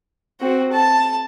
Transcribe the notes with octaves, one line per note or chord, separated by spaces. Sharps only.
C4 F#4
A5